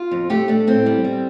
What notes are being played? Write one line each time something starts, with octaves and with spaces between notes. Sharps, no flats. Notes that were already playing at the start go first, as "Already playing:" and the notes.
Already playing: F4
F2
A3 G4
A3 D4
A2 C4
G3
G3